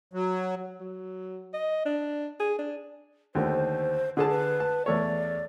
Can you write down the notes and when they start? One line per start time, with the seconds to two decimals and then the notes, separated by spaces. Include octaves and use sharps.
0.13 F#3
0.80 F#3
1.54 D#5
1.86 D4
2.40 G#4
2.59 D4
3.35 D#2 D3 A3 C5
4.17 D3 G#4 A4 A5
4.29 B4
4.60 A5
4.86 E2 A3 C#5 D5